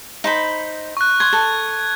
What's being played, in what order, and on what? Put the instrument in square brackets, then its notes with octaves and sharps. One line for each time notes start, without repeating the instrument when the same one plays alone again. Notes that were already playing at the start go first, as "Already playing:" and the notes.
[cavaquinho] D#4 C5 B5
[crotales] C#6 F#6
[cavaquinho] C6 [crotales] G#6
[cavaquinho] A4